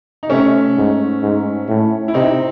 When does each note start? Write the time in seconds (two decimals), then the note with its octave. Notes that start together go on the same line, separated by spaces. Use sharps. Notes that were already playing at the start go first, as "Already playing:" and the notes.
0.23 D#4
0.29 C3 A3 C#4
0.76 G#2
1.22 G#2
1.68 A2
2.08 E4
2.14 C3 C4 D#4